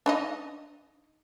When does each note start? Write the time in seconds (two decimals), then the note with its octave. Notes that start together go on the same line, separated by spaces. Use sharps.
0.06 D4 D#4 D#5